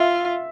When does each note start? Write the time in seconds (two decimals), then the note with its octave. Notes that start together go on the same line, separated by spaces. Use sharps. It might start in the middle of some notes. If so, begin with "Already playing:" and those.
Already playing: F4 E5